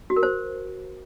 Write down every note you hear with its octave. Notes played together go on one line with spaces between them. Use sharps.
F#4
A#4
C5